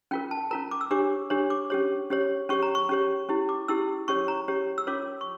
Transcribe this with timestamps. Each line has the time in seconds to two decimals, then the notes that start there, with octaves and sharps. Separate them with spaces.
0.11 C#4 F4 A#4 G5
0.31 A5
0.51 C#4 F4 A#4 A#5
0.71 D6
0.81 E6
0.91 D4 G4 C#5 D6
1.30 D4 G4 C#5
1.50 D6
1.70 C#4 G4 C#5
2.10 C#4 G4 C#5
2.49 C#4 G4 C#5 C#6
2.63 A#5
2.75 C#6
2.89 C#4 G4 C#5
3.29 C#4 E4 G4
3.49 D6
3.68 C#4 E4 G4 E6
4.08 C#4 G4 C#5 C#6
4.28 A#5
4.48 C#4 G4 C#5
4.78 E6
4.87 C#4 F4 A#4 C#5 D6
5.21 C#6